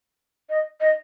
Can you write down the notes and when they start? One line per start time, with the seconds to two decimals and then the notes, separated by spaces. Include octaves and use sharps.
0.50 D#5
0.81 D#5